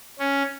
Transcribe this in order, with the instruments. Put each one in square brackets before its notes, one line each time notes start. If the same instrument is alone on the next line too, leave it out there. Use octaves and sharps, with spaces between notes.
[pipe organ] C#4